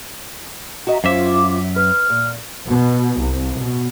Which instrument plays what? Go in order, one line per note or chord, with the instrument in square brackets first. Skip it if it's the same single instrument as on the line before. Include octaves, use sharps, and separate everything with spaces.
[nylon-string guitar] F#4 D#5 [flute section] E5 A#5
[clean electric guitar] F#2 E5 [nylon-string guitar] C#4 C5 F5 [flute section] F4 D6
[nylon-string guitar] B4 [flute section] F6
[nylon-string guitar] A#2
[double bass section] B2
C2
B2